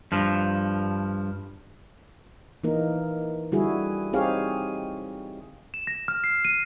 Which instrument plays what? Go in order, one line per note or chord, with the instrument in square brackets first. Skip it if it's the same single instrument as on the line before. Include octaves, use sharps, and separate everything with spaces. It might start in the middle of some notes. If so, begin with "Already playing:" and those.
[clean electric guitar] G2 F3
[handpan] E3 A#3 D#4 A#4
D3 G3 E4 F#4 G#4
C4 D#4 G4 G#4 C#5 F5
[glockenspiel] E7
A#6
F6
C7
D#7